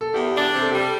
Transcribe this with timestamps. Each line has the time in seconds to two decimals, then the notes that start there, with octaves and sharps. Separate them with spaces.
0.01 A4
0.14 E2 G4
0.26 G4
0.34 D4
0.41 G4
0.53 C3
0.62 A4
0.71 G3 G4
0.78 A4